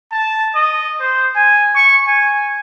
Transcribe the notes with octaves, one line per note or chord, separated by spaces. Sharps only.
A5
D#5
C5
G#5
C#6
G#5